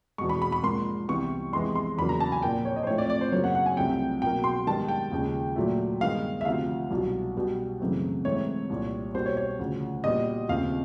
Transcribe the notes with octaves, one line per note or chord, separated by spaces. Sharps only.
E2 B2 G#3 C#6
B5
B5
B5
G#2 F3 A#3 C6
C2 C3 E3 G3 B3 C#6
F2 C3 E3 G#3 B3 C6
C6
E2 C#3 F#3 A#3 B5
A#5
A5
G#5
A#2 F3 A#3 G5
C#5
D#5
C5
A2 F3 A3 C4 C#5
D5
D5
C5
F#2 C#3 F#3 A#3 C#5
F#5
F#5
G#5
C2 C3 F3 A3 C4 G5
B2 F#3 A#3 G5
C6
G#2 D#3 G3 B3 A5
G5
D#2 C#3 F3 G#3
A#2 F#3 A3
G2 D#3 G#3 B3 F5
E5
D2 C3 F3 F5
C2 B2 F#3
B2 G3 B3
F#2 C#3 E3 A3 C4
G#2 E3 A3 C4 C#5
C2 A#2 G3
B2 G3 A#3 C5
C#5
C#5
D2 C#3 F3
A#2 G3 B3 D#5
D#2 C#3 F3 A3 C4 F5